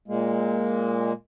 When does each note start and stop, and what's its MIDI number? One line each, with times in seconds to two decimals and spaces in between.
0.08 1.12 46
0.08 1.12 56
0.08 1.12 58